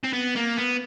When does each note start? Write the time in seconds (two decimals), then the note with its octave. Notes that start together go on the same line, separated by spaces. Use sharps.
0.03 C4
0.13 B3
0.35 A#3
0.57 B3